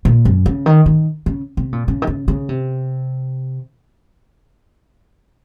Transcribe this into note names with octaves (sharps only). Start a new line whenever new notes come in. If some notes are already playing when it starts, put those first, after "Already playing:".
A#2
F#2
C#3
D#3
D#3
C#3
C3
A#2
C#3
D#3
C#3
C#3
C3